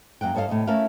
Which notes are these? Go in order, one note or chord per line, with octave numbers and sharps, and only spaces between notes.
F#2 A#3 F#5 G5
G2 A4 C#5 D#5 F5 A5
A2 C3 D#5
A3 C#4 E4 A#4 E5 F5